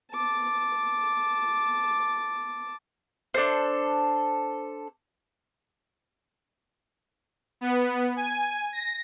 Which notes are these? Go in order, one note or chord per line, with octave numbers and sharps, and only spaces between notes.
A5 D6
D4 A4 C5
B3
G#5
A#6